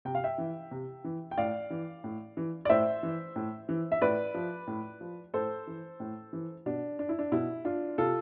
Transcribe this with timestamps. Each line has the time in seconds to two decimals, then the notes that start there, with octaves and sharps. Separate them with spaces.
0.05 C3 G5
0.15 F5
0.24 E5 G5
0.38 E3
0.71 C3
1.04 E3
1.31 G5
1.38 A2 D5 F5
1.70 E3
2.04 A2
2.37 E3
2.65 D5
2.69 A2 C5 E5
3.03 E3
3.36 A2
3.69 E3
3.92 E5
4.01 A2 B4 D5
4.34 F3
4.67 A2
5.01 F3
5.34 A2 A4 C5
5.67 E3
6.00 A2
6.33 E3
6.66 B2 D4
6.99 D4
7.09 E4
7.19 D4
7.32 B2 E4
7.65 D4 F4
7.98 C3 F4 A4